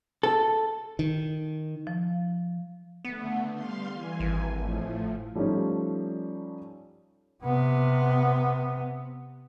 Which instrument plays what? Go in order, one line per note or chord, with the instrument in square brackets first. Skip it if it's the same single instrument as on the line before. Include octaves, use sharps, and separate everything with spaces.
[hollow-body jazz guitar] A4
[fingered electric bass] D#3
[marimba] F3
[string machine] D3 A3 [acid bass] B3
[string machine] G3 F5 C6
E3 G#5
[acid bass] G#1
[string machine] A2 F3 A3
[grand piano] F3 G3 A3 C#4 D#4
[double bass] C3 B3